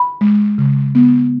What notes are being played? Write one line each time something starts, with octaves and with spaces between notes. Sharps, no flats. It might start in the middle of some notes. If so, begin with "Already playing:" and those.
Already playing: B5
G#3
C#3
B3